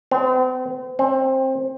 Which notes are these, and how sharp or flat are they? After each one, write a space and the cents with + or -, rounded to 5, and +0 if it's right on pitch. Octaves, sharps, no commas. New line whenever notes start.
C4 -40
C4 +20